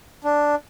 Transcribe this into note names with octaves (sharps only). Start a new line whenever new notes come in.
D4